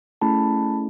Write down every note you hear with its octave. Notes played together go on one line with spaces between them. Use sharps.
A3 C#4 E4 G#4 A5 B5